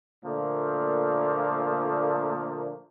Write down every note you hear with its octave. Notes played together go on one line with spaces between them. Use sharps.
A#2 D3 F3 A3 A#3